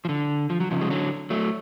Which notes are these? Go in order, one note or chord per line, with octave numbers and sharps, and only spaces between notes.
F3
D3
F3
F#3
C#3 F3
G#3
D3 F#3
F#3 A3